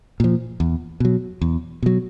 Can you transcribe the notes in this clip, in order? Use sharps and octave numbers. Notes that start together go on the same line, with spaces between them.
A#2 F3
E2
B2 F#3
E2
B2 F#3